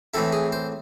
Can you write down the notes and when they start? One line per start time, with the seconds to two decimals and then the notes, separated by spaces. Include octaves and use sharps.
0.14 A2 E3 C4 E4 A4
0.33 G#4
0.52 C5